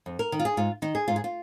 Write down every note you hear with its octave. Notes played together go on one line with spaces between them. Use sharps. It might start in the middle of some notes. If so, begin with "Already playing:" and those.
F2
A#4
D#3
F4
G#4
G#2 F4
D#3 D#4
G#4
G#2 F4
G#4
F4